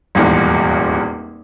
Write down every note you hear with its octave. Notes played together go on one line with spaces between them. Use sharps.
D#1 G#1 E2